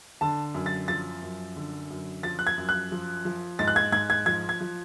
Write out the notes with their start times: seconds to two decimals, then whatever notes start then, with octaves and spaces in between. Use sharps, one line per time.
0.21 D3 A5
0.54 F#2
0.66 A6
0.88 F3 A6
1.22 F#2
1.56 D3
1.90 F#2
2.23 F3 A6
2.39 F#6
2.47 G#6
2.58 F#2
2.69 F#6
2.92 F3
3.25 F3
3.59 G#2 A6
3.68 F#6
3.76 G#6
3.92 G#2 G#6
4.10 G#6
4.26 F3 G#6
4.49 G#6
4.61 F3